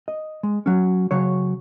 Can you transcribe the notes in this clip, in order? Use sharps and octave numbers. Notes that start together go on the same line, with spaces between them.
D#5
G#3
F#3 C#4
C#3 F#3 C#5